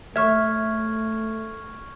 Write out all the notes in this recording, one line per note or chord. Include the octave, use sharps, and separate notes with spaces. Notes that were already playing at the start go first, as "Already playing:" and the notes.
A3 C#5 E5 C#6 F6 G#6